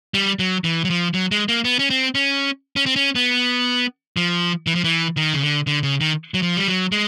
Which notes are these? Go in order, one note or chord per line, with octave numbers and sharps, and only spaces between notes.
G3
F#3
E3
F#3
F3
F#3
G#3
A#3
B3
C#4
C4
C#4
C#4
C4
C#4
B3
F3
E3
F3
E3
D#3
C#3
D3
D3
C#3
D#3
F#3
F3
G3
F#3
G#3